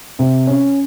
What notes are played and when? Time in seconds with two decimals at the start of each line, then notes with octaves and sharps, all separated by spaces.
0.19 C3
0.47 C#4